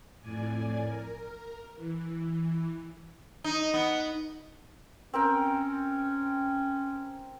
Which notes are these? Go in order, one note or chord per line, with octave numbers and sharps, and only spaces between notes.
F2 A2 D5 G#5
A#4
E3
D#4
B3
C4 C#4 A#4 G5